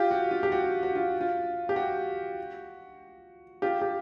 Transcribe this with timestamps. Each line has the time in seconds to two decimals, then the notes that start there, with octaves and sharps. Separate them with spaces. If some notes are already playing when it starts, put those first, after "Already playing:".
Already playing: F4 G4
0.11 F#4
0.31 F4
0.43 G4
0.52 F#4
0.83 F#4
0.95 F4
1.21 F4
1.69 G4
1.76 F#4
3.62 F4 G4
3.82 G4